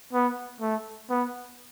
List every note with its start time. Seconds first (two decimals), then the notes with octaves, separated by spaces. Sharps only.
0.13 B3
0.61 A3
1.10 B3